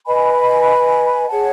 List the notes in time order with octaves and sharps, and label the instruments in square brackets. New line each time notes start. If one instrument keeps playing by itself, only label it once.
[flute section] B4 D#5 G#5 B5
G#4 C#5 F#5 A5